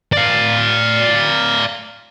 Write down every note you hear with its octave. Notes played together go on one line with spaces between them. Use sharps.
D5 F5